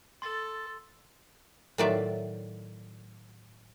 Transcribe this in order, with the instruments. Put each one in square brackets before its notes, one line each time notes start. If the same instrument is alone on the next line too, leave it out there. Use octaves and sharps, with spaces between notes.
[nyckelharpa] A4 [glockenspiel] C6 A6
[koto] A2 D#3 F#3 F4 D5 E5